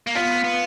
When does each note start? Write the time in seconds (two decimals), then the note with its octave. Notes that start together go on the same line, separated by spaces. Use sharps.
0.07 A#3
0.15 B3 F4
0.44 B3